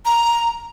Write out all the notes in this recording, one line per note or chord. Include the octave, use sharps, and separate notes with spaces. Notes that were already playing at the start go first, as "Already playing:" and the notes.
A#5